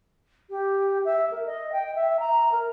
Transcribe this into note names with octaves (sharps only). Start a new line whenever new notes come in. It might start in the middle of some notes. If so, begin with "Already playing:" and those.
G4
E5
A#4
D#5
G5
E5
A#5
A#4